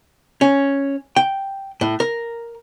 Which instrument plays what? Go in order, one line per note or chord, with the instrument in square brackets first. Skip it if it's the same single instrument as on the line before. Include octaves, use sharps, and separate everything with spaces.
[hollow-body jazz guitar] C#4
G5
A2
A#4